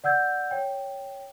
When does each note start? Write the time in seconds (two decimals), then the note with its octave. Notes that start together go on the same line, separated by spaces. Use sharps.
0.04 D5 F#5 E6 G6 G#6
0.51 C#5 G5